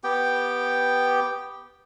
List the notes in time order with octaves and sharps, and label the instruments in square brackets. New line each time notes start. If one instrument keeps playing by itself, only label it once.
[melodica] B3 G4 G5